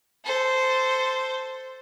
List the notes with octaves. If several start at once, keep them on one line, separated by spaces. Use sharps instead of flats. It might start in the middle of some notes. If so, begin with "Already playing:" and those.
A4 C5